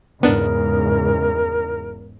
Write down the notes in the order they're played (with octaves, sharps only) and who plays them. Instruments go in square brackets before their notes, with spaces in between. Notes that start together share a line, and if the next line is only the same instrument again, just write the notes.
[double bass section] E2 G#2 C#3 [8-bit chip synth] B3 D4 [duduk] A#4